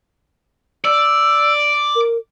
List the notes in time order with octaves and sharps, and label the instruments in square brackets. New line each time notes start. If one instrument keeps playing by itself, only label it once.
[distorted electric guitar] D5 [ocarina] E6
[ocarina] A#4